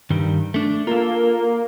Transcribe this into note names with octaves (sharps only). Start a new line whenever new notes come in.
G2 D#3 G3
A3 D4
A#3 F4 A4